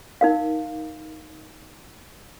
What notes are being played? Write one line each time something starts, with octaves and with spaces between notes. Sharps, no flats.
D#4 A#4 F5